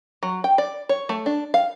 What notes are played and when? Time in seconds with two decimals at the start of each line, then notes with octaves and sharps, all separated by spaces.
0.23 F#3
0.44 G5
0.58 D5
0.89 C#5
1.09 A3
1.26 D4
1.54 F5